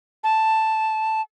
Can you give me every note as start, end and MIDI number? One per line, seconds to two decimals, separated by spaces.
0.24 1.22 81